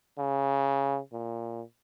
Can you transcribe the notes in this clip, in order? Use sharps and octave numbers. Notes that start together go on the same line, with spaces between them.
C#3
A#2